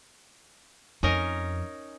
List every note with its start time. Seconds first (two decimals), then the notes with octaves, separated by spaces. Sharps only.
1.03 F2 C#4 D#4 A#4